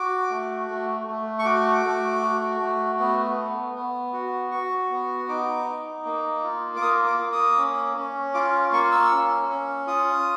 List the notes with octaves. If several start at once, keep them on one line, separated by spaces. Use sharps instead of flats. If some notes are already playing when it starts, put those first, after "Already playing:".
Already playing: F#4 D6
A3
A3
A3
C#6
F#4 D6
A3
F#4
A3
B3
B3
B3
F#4
F#4 C#6
B3
D#4 D6
D#4
A#3
F4
D6
A#3 D#6
D6
A#3
D#6
C#4
C#4
F4 D6
A#3 C#6
E6
C#4
C#4
F4 D#6